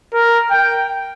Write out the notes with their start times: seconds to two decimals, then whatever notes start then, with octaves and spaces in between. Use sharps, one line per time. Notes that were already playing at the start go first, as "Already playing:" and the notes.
0.13 A#4
0.51 G5